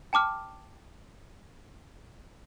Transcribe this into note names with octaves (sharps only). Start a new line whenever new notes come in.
G5 A5 D6 F6